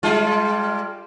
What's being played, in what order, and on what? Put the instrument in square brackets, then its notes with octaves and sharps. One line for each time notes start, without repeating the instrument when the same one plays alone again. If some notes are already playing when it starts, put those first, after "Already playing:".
[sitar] G3 G#3 F4